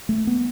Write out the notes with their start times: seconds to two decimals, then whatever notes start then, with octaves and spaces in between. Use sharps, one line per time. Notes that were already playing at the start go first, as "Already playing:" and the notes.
0.09 A3
0.27 B3